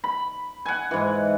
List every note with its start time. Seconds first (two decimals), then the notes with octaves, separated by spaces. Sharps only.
0.04 B5
0.66 F#5 G#5
0.91 G#2 E3